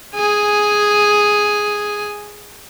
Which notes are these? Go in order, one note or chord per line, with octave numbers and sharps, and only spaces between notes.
G#4 G#5